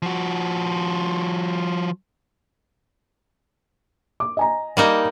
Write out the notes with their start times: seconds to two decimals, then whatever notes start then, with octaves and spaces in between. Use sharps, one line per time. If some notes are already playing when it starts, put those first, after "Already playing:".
0.02 F3 F#4
4.20 D6
4.37 D#5 G#5 A#5
4.77 G3 A#3 D#4